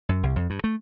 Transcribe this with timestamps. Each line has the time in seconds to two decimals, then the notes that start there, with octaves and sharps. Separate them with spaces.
0.09 F#2
0.23 C2
0.36 F2
0.50 G2
0.64 A3